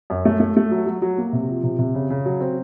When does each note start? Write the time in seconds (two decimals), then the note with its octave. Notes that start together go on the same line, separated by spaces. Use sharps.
0.10 F#2
0.25 A3
0.40 A3
0.57 A3
0.71 F#3
0.86 F#3
1.02 F#3
1.18 A#3
1.33 C3
1.49 F3
1.64 C3
1.79 C3
1.95 C#3
2.10 C#3
2.26 F#3
2.41 C4